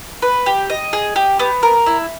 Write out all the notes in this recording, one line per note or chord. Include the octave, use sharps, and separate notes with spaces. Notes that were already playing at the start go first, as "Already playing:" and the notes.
B4
G4
D#5
G#4
G4
B3
A#4
E4